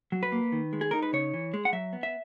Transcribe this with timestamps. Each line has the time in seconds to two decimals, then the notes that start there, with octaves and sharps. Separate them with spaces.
0.12 F#3
0.23 B4
0.32 A#3
0.52 D#3
0.73 G#3
0.81 G#4
0.91 D#4 A#4
1.02 B4
1.13 C#3 C#5
1.34 E3
1.54 G#3
1.65 F#5
1.73 F#3 E5
1.93 B3
2.03 E5